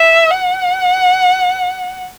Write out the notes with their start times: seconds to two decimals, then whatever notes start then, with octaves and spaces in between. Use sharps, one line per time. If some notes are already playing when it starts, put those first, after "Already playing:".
Already playing: E5
0.31 F#5